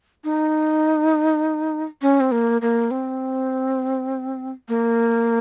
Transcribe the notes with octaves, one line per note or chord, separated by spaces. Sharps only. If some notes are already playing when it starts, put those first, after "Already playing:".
D#4
C#4
C4
A#3
A#3
C4
A#3